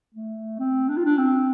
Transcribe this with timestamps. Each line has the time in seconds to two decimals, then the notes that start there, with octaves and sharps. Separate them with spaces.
0.15 A3
0.59 C4
0.89 D4
0.97 F4
1.05 D4
1.18 C4